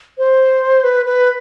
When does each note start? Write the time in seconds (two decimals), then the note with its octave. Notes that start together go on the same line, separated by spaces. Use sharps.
0.18 C5
0.84 B4
1.06 B4